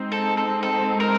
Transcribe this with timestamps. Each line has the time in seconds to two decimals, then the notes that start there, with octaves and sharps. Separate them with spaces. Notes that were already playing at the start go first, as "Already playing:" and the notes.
Already playing: G#3 C4 D#4
0.12 A4
0.37 A4
0.63 A4
1.00 A#4